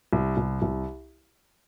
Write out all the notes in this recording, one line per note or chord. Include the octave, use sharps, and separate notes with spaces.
C2
C2
C2